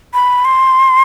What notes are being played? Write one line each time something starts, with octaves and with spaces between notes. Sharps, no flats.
B5
C6